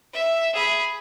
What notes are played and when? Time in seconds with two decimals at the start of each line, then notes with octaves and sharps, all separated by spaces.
0.13 E5
0.53 G#4 B5